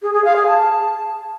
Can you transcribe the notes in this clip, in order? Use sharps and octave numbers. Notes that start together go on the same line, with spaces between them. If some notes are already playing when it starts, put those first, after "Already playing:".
G#4
G#4
F5
G#4
A5